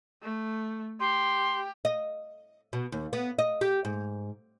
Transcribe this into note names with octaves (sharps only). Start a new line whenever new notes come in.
A3
G4 C6
D#5
B2
D#2
B3
D#5
G4
G#2